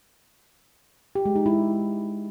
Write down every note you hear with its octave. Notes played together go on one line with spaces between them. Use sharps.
G4
G#3
D#4
E4